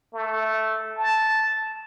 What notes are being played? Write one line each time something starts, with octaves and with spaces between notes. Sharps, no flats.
A3
A5